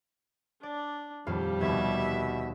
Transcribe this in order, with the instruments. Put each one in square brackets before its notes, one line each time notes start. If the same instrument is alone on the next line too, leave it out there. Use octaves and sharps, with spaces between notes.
[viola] D4 [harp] D5
[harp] D#1 F2 F5 [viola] G3 G4
[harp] F1 D#2 G#6 [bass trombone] B2 [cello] E5